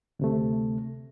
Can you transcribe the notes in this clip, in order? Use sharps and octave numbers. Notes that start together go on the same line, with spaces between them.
D2 C3 A3